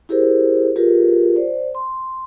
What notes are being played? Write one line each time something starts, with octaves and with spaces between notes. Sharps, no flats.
E4 G4 G#4 A#4 C5
F4 G4 G#4 A#4 B4
C5 D5
C6